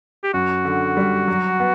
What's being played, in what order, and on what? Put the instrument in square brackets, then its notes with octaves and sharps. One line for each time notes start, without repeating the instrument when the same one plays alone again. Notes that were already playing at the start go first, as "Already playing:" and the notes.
[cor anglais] G4
[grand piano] F#2 [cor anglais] F#4
[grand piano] D3
G3
F#3
B3